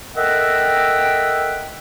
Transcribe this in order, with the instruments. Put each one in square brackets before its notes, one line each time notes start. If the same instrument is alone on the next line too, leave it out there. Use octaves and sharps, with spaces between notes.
[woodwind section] A4 A#4 D#5 E5 F#5 G5